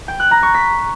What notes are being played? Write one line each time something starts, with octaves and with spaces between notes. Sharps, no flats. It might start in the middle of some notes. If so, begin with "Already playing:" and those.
G5
F#6
A#5
C#6
B6